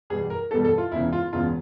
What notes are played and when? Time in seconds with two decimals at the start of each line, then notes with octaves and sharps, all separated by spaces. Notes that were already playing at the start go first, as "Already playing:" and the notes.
0.10 E2 B2 G3 G#4
0.30 A#4
0.51 E2 B2 G3 A4
0.65 A4
0.78 F4
0.92 E1 E2 C#3 E4
1.13 F4
1.33 E1 E2 C#3 F4